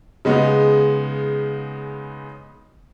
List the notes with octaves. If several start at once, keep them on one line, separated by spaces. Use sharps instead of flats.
C#3 G#3 B3 D#4